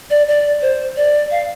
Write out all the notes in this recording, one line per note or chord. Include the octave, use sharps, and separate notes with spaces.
D5
D5
C5
D5
F5